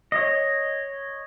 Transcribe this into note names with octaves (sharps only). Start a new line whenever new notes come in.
C#5 D#5